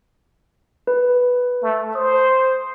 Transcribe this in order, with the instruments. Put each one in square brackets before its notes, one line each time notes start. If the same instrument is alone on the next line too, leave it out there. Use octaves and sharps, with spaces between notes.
[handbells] B4
[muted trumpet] A3
[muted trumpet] C5 [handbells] D#6